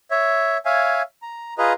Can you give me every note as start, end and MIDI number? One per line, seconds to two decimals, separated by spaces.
0.11 0.57 73
0.11 0.57 76
0.65 1.02 73
0.65 1.02 76
0.65 1.02 77
0.65 1.02 80
1.22 1.54 82
1.58 1.73 65
1.58 1.73 68
1.58 1.73 71
1.58 1.73 75
1.58 1.73 82